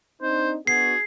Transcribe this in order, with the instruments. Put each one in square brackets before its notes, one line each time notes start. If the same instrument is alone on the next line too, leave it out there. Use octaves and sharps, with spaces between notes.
[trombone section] C4 D4 D#4 [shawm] C5
[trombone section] B3 D4 F#4 [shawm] G#4 [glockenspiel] C7